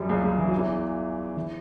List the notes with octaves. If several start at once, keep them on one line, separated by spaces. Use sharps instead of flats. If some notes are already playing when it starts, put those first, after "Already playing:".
Already playing: F#2 F#3 G3
C#2 C#3
C#2 C#3
E3
F#3
E2 E3
E3